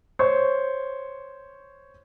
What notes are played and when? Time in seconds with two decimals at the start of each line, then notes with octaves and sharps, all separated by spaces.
0.19 C5 C#5 C#6